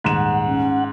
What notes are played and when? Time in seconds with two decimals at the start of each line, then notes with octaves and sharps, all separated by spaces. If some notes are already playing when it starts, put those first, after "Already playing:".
0.04 D#1 G#2 F#5 E7
0.47 C#4